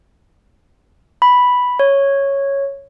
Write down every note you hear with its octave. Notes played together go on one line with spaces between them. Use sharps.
B5
C#5